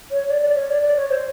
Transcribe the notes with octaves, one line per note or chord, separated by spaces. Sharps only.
C#5
D5
D5
C#5
D5
D5
C#5
C5